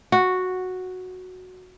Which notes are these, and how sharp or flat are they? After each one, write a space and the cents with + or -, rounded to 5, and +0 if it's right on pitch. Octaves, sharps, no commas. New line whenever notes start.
F#4 -5